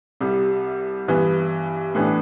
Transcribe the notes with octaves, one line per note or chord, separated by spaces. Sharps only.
C2 C3 G3
G2 E3 B3
A2 E3 B3 D4